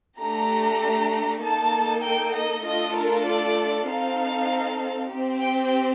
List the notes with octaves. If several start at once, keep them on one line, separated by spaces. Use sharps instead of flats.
A3 D4 G4 A#5
A#3 D#4 A4 A5
G5
D#5
A3 D4 F4 A4 D#5
A#4
D5
C4 D#4 A4 F5
C4 G4
G5